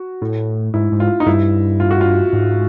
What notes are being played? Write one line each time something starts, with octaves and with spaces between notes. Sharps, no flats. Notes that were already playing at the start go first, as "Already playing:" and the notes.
Already playing: F#4
A2
G#2 E4
G#2
F4
D#4
G2 E4
F4
F#4
F4
G#2